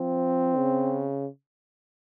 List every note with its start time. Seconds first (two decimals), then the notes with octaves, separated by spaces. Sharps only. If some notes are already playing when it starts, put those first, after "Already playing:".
Already playing: F3 C4
0.57 C#3